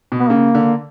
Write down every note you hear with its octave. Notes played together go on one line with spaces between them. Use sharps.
B2
B3
C#3 A#3
D3